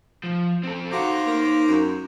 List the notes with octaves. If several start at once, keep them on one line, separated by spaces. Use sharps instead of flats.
F3
C4 A4
D#4 F#4 C5 F5 A#5 D6
A#3
F#2